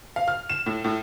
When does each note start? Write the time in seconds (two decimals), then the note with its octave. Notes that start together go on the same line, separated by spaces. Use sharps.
0.16 F5
0.28 F6
0.49 E7
0.66 A2
0.84 A2